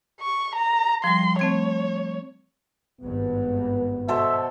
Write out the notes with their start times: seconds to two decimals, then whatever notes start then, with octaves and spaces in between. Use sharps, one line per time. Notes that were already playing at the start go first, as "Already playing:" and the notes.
0.21 C#6
0.55 A#5
1.04 F3 G3 C6
1.39 A3 C4 C#5 G#6
3.01 G#1 G2 B3
4.08 B2 A4 C5 E5